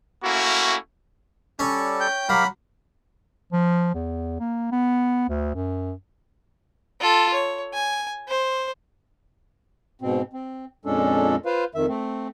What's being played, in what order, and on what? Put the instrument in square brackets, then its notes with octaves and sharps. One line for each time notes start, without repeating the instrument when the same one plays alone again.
[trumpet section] A3 A#3 C#4 E4 F#4
[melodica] G3 A4 D5 [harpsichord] C#4
[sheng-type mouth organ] G5 G6
[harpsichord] F#3 [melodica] G4 A#4 F5 [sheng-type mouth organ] B5
[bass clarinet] F3
E2
A#3
B3
D2
F#2
[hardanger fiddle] F4 A4
C#5
G#5
C5
[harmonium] G#2 B2 C4
C4
F2 A#2 G#3 C#4 D4 A4
F4 B4 C5 F5
F2 D#3 E5
A3 C4